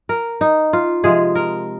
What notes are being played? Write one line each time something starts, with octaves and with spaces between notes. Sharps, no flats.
A#4
D#4
F4
C3 F3 G#3 G#4
A#4